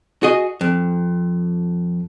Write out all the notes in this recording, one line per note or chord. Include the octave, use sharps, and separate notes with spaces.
F#4 G#4 D#5
F2